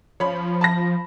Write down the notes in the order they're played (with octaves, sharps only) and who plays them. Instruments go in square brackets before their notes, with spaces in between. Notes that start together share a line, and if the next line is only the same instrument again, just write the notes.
[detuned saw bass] F3 [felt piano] C#5 B5
[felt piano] A5 B5 A#6